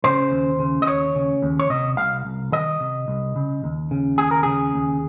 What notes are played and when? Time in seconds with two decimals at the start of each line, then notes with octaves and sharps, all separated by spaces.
0.04 C#3 C5
0.32 D#2
0.59 C#3
0.82 D#5
0.87 D#2 C#5
1.15 C#3
1.42 D#2
1.59 C#5
1.70 C3 D#5
1.97 C2 F5
2.25 C2
2.52 D#3 D#5
2.80 C3
3.08 C2
3.36 C#3
3.64 D#2
3.91 C#3
4.18 D#2 G#4
4.31 A#4
4.43 C#3 G#4
4.74 D#2